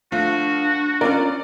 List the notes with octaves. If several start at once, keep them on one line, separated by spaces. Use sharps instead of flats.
F3 A3 D4 F4 F#4
C#4 F4 A#4 D5